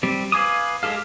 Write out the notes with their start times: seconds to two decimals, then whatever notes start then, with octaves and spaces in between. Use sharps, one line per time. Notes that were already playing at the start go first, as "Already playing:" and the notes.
0.03 G3 C4
0.32 B4 F5 G#5 D6 D#6
0.83 G#3 G4 A4 F5